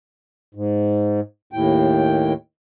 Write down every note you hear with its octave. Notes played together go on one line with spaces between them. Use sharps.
G#2
D#2 A2 G5